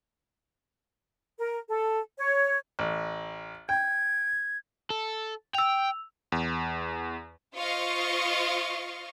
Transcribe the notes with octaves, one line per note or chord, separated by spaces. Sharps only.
A#4
A4
C#5
A1
G5 G#6
A4
G5 E6 F7
E2
F4 C5 D#5 F5 C#6